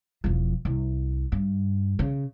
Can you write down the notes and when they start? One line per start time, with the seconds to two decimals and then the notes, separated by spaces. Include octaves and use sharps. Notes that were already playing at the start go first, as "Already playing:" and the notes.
0.24 E1 F3
0.65 C2
1.32 G2
1.99 C#3